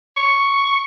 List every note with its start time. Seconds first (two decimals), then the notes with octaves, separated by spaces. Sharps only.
0.17 C#6